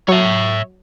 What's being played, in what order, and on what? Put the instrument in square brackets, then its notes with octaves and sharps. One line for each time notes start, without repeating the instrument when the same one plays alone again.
[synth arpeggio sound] F#3 [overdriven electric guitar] C#5 E5